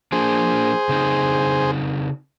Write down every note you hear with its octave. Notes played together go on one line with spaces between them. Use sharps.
F3 A#3 D4 G#4 C5
C#3 C4 D#4